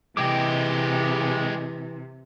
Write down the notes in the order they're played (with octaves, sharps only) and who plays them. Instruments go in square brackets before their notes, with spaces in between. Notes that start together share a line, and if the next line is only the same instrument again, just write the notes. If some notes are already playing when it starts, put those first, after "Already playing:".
[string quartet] C3 [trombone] E3 [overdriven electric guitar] G#3 G4 [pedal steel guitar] D#5 G5 D6